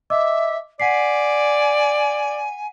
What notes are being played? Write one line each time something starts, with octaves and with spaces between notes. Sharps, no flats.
D#5 E5 D6 E6
D5 F#5 G#5 B6 C7